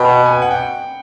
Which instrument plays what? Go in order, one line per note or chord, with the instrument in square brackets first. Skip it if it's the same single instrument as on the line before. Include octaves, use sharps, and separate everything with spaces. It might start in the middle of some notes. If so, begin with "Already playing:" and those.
Already playing: [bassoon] B2 [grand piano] G5 B5
[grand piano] F#5
G#5
G5
F#5
G5